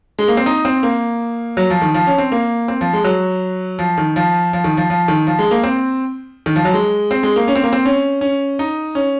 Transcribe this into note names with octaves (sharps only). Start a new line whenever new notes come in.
G#3
A#3
C4
D#4
C4
A#3
F#3
F3
D#3
F3
C#4
C4
A#3
C4
F3
G#3
F#3
F3
D#3
F3
F3
D#3
F3
F3
D#3
F3
G#3
A#3
C4
D#3
F3
F#3
G#3
C4
G#3
A#3
C#4
C4
A#3
C4
C#4
C#4
D#4
C#4